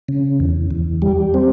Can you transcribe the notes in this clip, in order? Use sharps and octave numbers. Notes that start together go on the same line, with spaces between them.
C#3
E2
E2
G3
C4